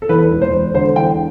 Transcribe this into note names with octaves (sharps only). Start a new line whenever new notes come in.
A4
E2 B4
E1
C5
E1
D3 C5
E2 G5